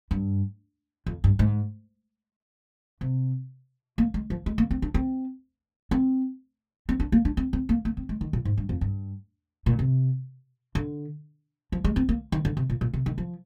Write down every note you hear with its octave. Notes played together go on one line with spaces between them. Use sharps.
G2
F2
G2
G#2
C3
A#3
G#3
F3
G#3
A#3
C4
D4
C4
C4
C4
D4
A#3
D4
C4
C4
A#3
A#3
C4
G#3
D#3
A#2
G#2
G2
F2
G2
A#2
C3
D3
F3
G#3
C4
A#3
D#3
D3
C3
A#2
A#2
C3
D#3
F3